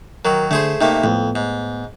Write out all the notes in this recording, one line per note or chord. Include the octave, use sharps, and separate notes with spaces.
D#3 F#3 A#4
D3 A3 G#4 C5
C3 A3 A#3 D#4
F2 A2 B3
G#2